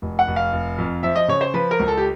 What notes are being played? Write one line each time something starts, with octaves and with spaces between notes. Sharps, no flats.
F1
F#5
F1
F5
F1
F2
F3 E5
D#5
C#3 C#5
C5
F3 B4
A#4
C#2
A4
G4